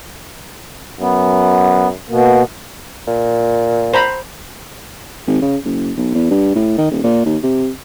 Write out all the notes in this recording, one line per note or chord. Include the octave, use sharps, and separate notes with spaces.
F#2 B3
B2 A#3
A#2
C5 A#5 B5
G#1
C#3
F#1
B1
E2
G2
A2
D#3
D#1
A#2
D#2
C3